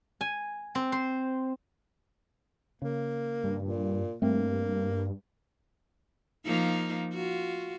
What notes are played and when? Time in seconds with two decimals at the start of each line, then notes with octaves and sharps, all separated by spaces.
0.21 G#5
0.75 C4
0.92 C5
2.82 C#3 A#3
3.43 G2
3.62 A#2
4.22 G2 A3 A#3 C4
6.46 F3 A#3 D#4
7.13 F4 F#4